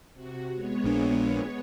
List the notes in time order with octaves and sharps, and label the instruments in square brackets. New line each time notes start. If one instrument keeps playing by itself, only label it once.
[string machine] C3 F#4
G#3 B3 C#5
[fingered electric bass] A#1 D4